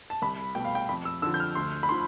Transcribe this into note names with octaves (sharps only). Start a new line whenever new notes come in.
A5
C2 B5
B2 A3 G5
F5
G5
F2 B5
E6
D3 F3 E6
G6
F6
D2 C6
B5
D3 F3 C6